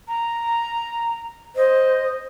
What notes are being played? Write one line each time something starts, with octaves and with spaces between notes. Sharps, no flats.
A#5
C5 D#5